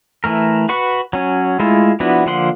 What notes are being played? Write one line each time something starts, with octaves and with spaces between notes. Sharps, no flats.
E3 A3 A#4
F#4 B4 C#6
F#3 C#4
G#3 A3 E4 F4
F3 B3 D4 E4 F#4
D3 F3 A#3 F#5 C6